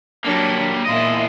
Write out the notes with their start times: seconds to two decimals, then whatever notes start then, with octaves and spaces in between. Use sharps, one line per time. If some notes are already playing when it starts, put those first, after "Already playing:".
0.25 F#3 G3 A#3 D4
0.86 E2 A#2 E4 F4 D#5